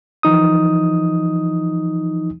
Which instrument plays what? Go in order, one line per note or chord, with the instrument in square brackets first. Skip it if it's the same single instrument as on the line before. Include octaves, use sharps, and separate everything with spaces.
[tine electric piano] E3 F3 D#4 D#6